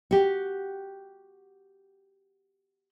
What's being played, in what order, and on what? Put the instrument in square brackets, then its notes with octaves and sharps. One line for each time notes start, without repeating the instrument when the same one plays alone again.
[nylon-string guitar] F#4 G4